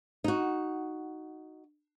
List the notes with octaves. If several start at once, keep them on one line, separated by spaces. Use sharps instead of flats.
D#4 F#4